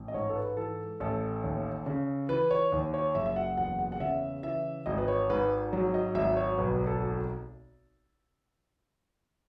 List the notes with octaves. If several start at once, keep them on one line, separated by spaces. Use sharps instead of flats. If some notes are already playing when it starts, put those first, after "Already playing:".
Already playing: A1
D#5
G#2 C#5
A4
B4
E3 A4
A1 A4
D#2
C#3
E3 B4
C#5
D#2
C#5
F#1 E5
E5
F#5
E2 F#5
F#5
F#5
C#3 E5
E3 E5
G#1 D#5
B4
C#5
G#2 B4
F#3
D#5
G#1 E5
C#5
B1 B4
A4